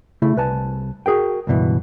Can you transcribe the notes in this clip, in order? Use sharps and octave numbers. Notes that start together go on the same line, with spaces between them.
C#3 A3 E4
C2 B4 G#5 A5
F#4 G#4 A#4 G5
C#2 G2 B2 E3